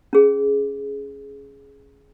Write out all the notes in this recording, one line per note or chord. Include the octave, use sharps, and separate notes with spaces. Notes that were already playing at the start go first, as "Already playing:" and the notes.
C#4 G#4